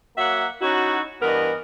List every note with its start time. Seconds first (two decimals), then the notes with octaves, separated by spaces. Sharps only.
0.17 F#3 A#3 E5 F#5
0.61 C#4 D#4 E4 F#4
1.21 G2 E3 B3 A#4 D#5